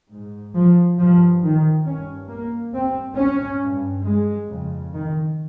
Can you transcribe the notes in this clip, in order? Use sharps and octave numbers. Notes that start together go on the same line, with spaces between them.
G#2
F3
G2 F3
D#3
G2 C#4
A#3
G2 C4
C#4
G2
G#3
F2 C#3
D#3